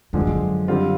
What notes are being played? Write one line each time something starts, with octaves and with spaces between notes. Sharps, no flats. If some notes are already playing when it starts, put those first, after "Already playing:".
F#2 D3 F3 G#3
F2
F#2
D3 G3 C4 F4